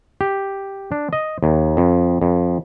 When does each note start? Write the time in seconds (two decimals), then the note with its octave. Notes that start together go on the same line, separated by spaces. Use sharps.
0.21 G4
0.92 D4
1.13 D#5
1.43 D#2
1.77 F2
2.22 F2